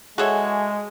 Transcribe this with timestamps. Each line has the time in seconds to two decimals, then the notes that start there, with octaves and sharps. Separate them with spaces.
0.18 G#3 F#4 G#4 A4 C#5 E5